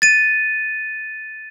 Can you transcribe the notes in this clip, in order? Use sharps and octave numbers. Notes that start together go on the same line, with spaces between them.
A6 D#7